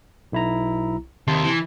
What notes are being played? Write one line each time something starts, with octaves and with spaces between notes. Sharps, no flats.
B1 E4 A#5
D#2 C3 A5 C6
E3